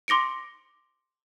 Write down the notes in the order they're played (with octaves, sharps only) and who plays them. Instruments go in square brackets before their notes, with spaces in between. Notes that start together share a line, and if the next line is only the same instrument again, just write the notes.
[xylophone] C6 D6 A#6 C#7 D7